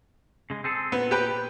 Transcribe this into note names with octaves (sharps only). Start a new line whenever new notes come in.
C#3 G#3
C4 G#4 A4
A#2 B3
G4 B4 G5